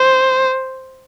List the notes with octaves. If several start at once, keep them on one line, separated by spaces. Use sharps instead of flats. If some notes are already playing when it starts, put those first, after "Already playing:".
Already playing: C5